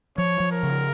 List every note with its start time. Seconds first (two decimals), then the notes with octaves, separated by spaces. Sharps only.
0.18 F3 C#5
0.40 F3
0.51 A#4
0.63 C#3